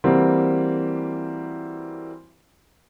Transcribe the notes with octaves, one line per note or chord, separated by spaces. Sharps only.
E3 G3 A#3 C4 F#4